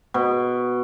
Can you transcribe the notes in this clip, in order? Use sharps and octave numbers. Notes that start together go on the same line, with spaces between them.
B2